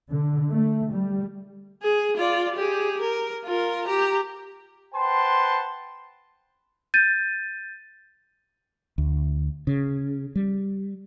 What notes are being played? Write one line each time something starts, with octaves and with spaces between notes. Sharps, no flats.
D3
A3
G3
G#4
F4 D5
G4 G#4
A#4
F4 A#4
G4 A#5
B4 C5 F#5 G5 A5 C6
G6 A6 D#7
D2
C#3
G3